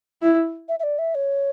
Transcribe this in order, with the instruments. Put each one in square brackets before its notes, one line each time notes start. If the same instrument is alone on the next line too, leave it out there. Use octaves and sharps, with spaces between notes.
[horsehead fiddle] E4
[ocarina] E5
E5
D5
E5
C#5